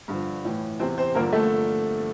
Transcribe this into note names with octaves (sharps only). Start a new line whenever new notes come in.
G2 D3 F3
A2 E3
E2 C3 E3 C4 C5
C4 C5
G2 D3 F3 A#3 A#4
A3 A4